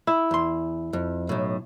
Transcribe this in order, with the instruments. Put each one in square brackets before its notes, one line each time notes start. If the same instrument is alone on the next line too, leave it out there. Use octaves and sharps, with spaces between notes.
[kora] E4
[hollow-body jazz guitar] E2 C6
F2
B1 A2